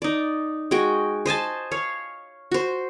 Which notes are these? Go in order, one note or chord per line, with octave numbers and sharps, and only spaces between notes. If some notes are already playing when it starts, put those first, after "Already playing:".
D#4 D5
G#3 F#4 G5
C5 D#5 G#5 A5
C#5 F5
F#4 C5